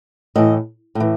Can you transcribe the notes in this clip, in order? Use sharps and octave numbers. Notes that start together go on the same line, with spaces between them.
A2 E3 D#5
A2 E3